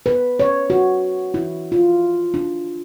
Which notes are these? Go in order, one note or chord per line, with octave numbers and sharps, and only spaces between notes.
B4
C#5
F#4
E4
F4
D4